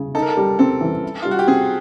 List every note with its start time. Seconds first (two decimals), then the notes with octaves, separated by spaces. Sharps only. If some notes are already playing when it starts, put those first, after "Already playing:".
Already playing: C#3
0.15 D#4 A4
0.22 A#4
0.30 A4
0.37 G3
0.59 C4 A4
0.81 E3
1.03 E4
1.22 G3 F4
1.31 F#4
1.39 G4
1.47 C4 G#4